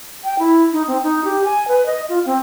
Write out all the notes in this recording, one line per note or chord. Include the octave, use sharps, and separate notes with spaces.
G5
E4
D#4
C4
D#4
G4
G#5
B4
D#5
F4
C4